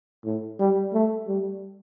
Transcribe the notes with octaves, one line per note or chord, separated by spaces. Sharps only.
A2
G3
A3
G3